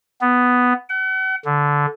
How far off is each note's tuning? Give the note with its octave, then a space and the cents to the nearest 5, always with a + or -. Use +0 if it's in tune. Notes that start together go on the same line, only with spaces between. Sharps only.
B3 +5
F#5 +40
D3 -15